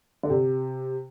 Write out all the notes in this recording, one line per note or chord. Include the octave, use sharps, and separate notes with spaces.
D3
C3